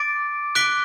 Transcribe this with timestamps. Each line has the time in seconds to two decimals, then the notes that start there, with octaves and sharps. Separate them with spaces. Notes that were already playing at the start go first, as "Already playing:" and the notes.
Already playing: D6 A6 D7
0.55 D6 F#6 B6 D7 G7